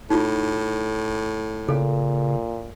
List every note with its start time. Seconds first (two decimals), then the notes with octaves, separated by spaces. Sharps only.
0.10 A2 D#4 F4
1.68 A#2 C#3 A4